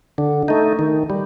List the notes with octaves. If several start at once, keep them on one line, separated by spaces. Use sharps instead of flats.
D3
A3 D#4
D#3
G3